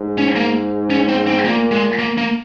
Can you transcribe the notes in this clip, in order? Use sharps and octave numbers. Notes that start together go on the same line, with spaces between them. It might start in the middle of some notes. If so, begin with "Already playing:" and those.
Already playing: G#2
C#4
A#3
C#4
C4
C4
A#2 A#3
G#3
A#3
A#3